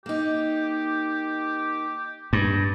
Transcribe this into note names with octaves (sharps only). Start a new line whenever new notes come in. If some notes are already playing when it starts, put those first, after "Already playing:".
A#3 D#4 G4
G2